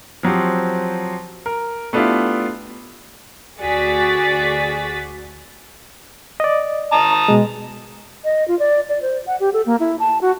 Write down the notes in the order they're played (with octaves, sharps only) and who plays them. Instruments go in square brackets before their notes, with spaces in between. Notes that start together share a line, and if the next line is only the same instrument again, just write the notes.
[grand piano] F3 F#3 C4 G4
A#4
A3 B3 D4 E4 F4 G4
[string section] D2 F#4 G#4 D5 A6 B6
[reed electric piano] D5 D#5
[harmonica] A5 A#5 D#6
[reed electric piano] B2 G#3
[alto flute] D#5
F4
D5
D5
C5
F#5
G4
A4
A#3
E4
A5
F#4